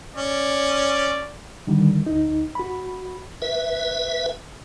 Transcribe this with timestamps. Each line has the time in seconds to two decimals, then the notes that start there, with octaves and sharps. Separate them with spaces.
0.16 C#4 D5
1.67 D3 D#3 G3
2.06 D2 D#4
2.55 F#4 B5
3.42 B4 E5